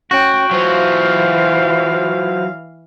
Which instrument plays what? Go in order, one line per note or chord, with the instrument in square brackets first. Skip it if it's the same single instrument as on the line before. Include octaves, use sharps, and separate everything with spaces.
[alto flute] C#4 [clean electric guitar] F#4 [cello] G5
[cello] E3 F5 [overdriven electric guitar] F#3 F4 [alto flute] C5